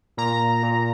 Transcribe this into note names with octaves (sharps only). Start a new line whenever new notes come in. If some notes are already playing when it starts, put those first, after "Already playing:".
A#2 A#5
A#2